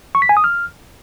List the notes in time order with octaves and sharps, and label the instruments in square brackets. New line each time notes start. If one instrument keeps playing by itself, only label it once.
[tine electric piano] C#6
B6
G#5
D#6
F6